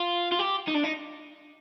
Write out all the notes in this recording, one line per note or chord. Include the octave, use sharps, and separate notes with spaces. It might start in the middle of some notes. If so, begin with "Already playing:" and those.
Already playing: F4
F4
G4
D#4
D4
D#4